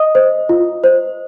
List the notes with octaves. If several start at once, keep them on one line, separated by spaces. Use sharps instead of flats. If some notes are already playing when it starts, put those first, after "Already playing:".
Already playing: D#5 D#6
C5
F4
C5